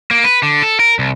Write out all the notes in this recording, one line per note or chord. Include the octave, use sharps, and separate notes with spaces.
A#3
B4
D3
A4
A#4
C2